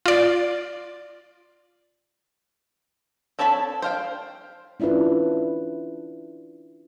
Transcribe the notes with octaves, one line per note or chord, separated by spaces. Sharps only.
F4 D5
C4 A4 C#5 A5 B5
C5 F5 G5
C#4 D4 E4 F4 B4